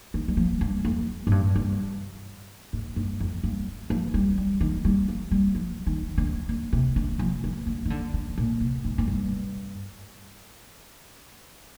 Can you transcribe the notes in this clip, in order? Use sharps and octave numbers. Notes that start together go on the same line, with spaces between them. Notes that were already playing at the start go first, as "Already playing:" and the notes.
D#3
G3
F3
G2
F2
G#2
G2
G2
G#2
G2
F2
G2
F3
G3
G3
D#3
G3
F3
G3
F3
D#3
D3
D3
C3
D3
F3
F3
D3
D#3
D3
D3
A#2
C3
G#2
G#2
G2